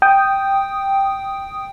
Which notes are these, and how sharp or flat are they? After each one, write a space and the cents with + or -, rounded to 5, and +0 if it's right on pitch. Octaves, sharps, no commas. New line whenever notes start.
G5 +0 D#6 +0